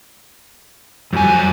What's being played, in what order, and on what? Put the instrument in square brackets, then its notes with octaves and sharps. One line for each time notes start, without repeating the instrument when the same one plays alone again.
[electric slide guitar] F2 G#5 [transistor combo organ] F#3 G3